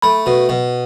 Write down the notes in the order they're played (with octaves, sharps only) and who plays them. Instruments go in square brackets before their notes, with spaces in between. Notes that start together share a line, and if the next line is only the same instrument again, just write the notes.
[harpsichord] A3 [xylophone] B5
[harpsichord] B2
B2